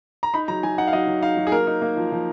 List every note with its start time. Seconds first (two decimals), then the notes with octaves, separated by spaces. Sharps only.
0.23 A#5
0.34 D#4 B5
0.48 F#3 A#5
0.63 F#3 G#5
0.78 D#4 F#5
0.87 F5
0.93 F#3 D#5
1.07 F#3
1.22 D#4 F5
1.37 F#3
1.47 G#4
1.52 A#3 A#4
1.67 D#4
1.82 A#3
1.96 F3
2.12 F3